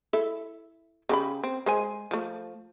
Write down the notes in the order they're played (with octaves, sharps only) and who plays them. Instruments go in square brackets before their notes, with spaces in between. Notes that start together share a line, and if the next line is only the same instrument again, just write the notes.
[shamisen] E4 A4 E5
C#3 G4 B5
C4
G#3 C5 G#5
F3 A3